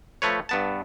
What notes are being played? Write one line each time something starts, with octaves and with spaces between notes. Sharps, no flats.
F3 A3 B4 C#5
G2 B3 A5